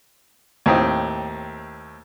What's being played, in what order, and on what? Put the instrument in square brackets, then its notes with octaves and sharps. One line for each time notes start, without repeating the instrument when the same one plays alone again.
[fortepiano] D#2 A2 C4 D#5